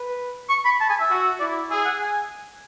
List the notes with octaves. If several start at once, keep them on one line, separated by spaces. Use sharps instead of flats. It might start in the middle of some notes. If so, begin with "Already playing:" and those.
Already playing: B4
C#6
B5
A5
G#5
E5
F#4
E4 D5
G#4 E5
F#5
G#5